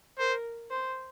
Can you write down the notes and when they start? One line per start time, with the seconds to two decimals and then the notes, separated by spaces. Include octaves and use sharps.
0.19 A#4 C5
0.70 C5